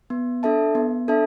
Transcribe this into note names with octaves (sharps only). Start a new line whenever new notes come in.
B3
D4 A4 E5 A5
B3
D4 A4 E5 A5